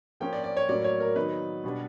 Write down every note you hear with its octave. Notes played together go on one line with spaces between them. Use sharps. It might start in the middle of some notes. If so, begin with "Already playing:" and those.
F3 A#3 C#4 G5
D5
D5
C#5
A2 F#3 A#3 C#4 D5
C#5
A#4
D#3 F#3 B3 D#4 B4
B2 G3 B3 D4